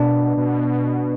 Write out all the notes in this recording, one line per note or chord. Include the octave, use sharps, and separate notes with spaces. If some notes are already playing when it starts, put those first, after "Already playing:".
Already playing: B2 D4
B2